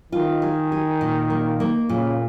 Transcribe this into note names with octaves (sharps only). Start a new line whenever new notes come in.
D#3 F4
G#4
G#4
A#2
A#3
A#3
A#2 C#3